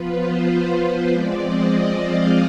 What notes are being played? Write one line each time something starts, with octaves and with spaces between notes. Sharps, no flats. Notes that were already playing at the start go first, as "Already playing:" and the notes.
Already playing: F3 B3 F4 B4
C5
F3 G#3 C4 D5
D#5
F5